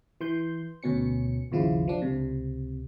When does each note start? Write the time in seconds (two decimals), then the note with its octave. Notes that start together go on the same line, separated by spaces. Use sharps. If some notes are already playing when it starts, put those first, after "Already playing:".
0.21 E3 C6 G6
0.83 D2 B2 C#4 C#7
1.51 G#1 D#2 C#3 F3 E4 F4
1.88 F3 D4
2.02 C#2 C3